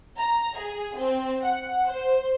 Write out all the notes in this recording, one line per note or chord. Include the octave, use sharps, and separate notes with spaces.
A#5
G#4
C4
F#5
C5